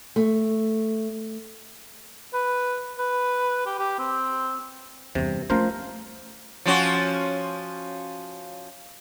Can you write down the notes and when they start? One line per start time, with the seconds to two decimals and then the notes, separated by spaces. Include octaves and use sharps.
0.16 A3
2.34 B4
2.99 B4
3.66 G4
3.79 G4
3.99 C4
5.15 E2 G2 C3
5.50 F3 A3 C#4 A#4 C5
6.66 F3 C#4 F#4